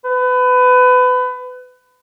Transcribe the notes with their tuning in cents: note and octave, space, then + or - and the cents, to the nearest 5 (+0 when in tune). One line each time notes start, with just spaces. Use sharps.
B4 +25